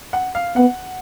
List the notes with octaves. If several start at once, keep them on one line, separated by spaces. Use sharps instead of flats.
F#5
F5
B3 F#5